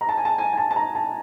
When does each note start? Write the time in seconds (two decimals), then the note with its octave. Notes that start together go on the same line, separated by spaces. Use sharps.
0.01 A#5
0.09 A5
0.17 G#5
0.25 A5
0.38 G#5
0.53 G#5
0.57 A5
0.71 A5
0.76 A#5
0.95 A5